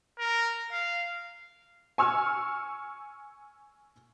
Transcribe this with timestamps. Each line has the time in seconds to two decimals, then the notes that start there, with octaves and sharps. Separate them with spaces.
0.19 A#4
0.72 F5
1.98 G#5 C#6 E6 F6